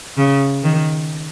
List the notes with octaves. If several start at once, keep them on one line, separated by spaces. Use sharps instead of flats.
C#3
D#3